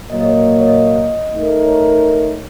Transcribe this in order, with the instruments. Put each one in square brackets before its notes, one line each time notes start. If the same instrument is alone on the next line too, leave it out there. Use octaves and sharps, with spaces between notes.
[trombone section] A#2 F#3 A#3 [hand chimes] D#5
[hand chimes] D#5
C#5
D#5
C#5
D#5
[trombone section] A3 D#4 A#4
[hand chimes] C#5